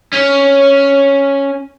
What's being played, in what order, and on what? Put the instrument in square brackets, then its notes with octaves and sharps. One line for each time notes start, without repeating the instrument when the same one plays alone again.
[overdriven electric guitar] C#4